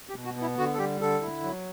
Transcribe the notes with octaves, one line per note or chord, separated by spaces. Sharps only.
G4
B2
F#4
B3 E4
D3 F#4
A4
G3 G4
D3 A4
E4
F#3